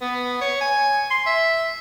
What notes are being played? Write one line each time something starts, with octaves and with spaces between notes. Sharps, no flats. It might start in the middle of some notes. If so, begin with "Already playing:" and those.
B3
C#5
G#5
C6
E5